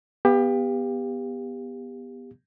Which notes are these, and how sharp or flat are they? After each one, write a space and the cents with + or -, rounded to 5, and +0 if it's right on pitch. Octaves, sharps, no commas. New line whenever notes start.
B3 +0 G4 +25 F5 +0